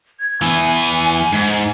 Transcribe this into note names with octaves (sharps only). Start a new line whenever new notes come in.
G#6
E3 B3 G#5
G#2